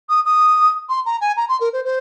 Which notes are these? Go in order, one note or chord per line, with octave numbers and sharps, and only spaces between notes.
D#6
D#6
C6
A#5
G#5
A#5
C6
A#4
C5
C5